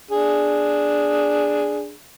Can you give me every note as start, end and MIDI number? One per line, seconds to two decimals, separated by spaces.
0.11 1.92 62
0.11 1.92 68